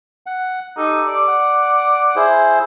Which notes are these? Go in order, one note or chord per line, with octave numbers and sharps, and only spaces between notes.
F#5
D#4 G4 A4
D5
F#5
E4 G#4 C5